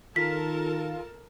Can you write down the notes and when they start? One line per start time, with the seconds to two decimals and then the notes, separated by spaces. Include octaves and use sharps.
0.16 D#3 F4 A4 A#4 A5 B6